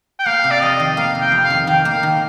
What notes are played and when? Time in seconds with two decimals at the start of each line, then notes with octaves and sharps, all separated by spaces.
0.19 G5
0.26 A#3 F5
0.44 C3
0.51 D5
0.61 F2 D#5
0.80 D#3
0.96 A#3 F5
1.15 C3
1.21 G5
1.32 F2
1.44 F5
1.50 D#3
1.67 D#3 G5
1.85 A#3
1.91 F5
2.03 D#3